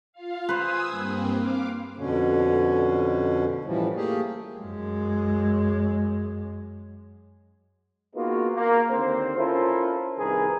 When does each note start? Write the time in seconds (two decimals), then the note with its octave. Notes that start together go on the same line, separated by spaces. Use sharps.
0.13 F4 F5
0.49 B4 C5 G#5 D#6 E6
0.90 G2 A#3 C4
1.35 F5 D6
1.97 F2 B2 D3 C#4
3.65 A2 E3 F3 G3
3.96 A3 A#3 G4 G#4
4.59 F#2 G#3
8.15 A#3 B3 D#4 F4 F#4 G#4
8.55 A#3
8.90 D#2 D3 C4 C5
9.38 C#4 E4 F4 A4 A#4 C5
10.19 C2 D#3 G#4 A#4 B4